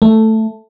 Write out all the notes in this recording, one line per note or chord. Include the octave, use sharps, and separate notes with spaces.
A3